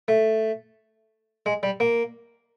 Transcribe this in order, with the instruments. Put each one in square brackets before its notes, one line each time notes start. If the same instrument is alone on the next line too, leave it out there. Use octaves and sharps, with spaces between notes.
[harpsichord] A3
G#3
G3
A#3